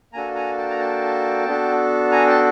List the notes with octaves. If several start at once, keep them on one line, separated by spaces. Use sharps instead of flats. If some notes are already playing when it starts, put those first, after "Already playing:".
A#3 D4 F#4 A4 G#5 A#5
G#5 A#5
G5 A5
A#5
G5 A5
B3 D4 F#4 A4
G#5 A#5
G5 A5